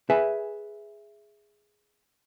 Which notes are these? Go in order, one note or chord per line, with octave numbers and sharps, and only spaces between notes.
G#4 B4 E5 G#5